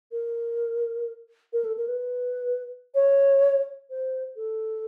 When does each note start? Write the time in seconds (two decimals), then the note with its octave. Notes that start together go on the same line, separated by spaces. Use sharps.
0.12 A#4
1.53 A#4
1.64 A4
1.77 A#4
1.88 B4
2.95 C#5
3.90 C5
4.36 A4